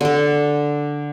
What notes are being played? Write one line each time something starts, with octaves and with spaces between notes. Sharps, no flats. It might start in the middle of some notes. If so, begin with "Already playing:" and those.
D3 A4